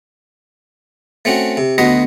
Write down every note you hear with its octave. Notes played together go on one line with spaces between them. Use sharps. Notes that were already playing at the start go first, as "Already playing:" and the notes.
A3 C4 C#4 F#4
C3
D2 B3 F#4 D#5 B5 C6